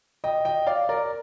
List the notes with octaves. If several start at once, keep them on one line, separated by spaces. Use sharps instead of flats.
D#5 G5
D#5 G5
D5 F5
A#4 D5